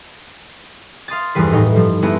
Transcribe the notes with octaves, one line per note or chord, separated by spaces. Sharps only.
F5 C6 D#6 A6
F1 E2 G2 G3 B4 C7
A2 D#4
G2 F3 G3
G2 G#3 A3 B3 E4